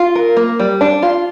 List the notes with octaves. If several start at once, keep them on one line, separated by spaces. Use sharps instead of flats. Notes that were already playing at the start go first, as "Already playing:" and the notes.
Already playing: F4
A#4
A#3
G3
D4
F4